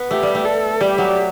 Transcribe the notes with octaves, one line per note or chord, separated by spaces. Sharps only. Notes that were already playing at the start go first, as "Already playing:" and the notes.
Already playing: B3
A3 G4
G3
A3
A4
G3 G4
F#3